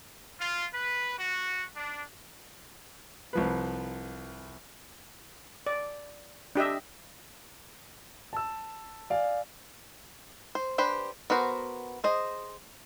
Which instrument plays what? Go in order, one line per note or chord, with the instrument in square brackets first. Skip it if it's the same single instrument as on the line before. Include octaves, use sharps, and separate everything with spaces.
[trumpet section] F4
B4
F#4
D4
[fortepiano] C2 F3 B4
[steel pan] D5
D4 G4 D#5 E5
[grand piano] A5 E6
D5 F5 G#5
[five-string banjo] C5
D4 G4 B4 C5
B3 F#4 A#4 C5
G#4 C5 D#5